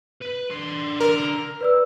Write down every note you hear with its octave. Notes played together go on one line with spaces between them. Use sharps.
B4
D3 C6
A#4
B4 D5 E6